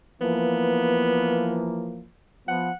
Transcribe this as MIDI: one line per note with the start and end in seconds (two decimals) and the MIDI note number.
0.21 2.07 52
0.21 2.07 53
0.21 2.07 58
0.21 1.73 59
2.48 2.70 53
2.48 2.70 59
2.48 2.74 78